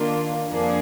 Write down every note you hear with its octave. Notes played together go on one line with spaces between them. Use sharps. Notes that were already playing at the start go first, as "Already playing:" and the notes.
Already playing: D#3 A#3 D4 F4
F2 F3 A#3 D4 G#4